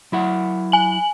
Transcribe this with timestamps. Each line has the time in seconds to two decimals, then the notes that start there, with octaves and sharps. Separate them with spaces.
0.12 F#3 E4 F#5
0.72 G#5 F#7